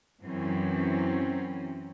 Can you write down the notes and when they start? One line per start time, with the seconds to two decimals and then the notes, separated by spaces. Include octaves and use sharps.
0.24 F#2 E3 F#3 C4 C#4